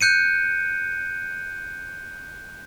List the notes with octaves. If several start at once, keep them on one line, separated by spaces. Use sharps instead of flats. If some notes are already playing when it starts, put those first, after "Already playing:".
F#6 G6 C#7 D#7